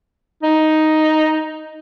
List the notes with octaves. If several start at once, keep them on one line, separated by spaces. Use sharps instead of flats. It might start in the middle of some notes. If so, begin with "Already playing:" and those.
D#4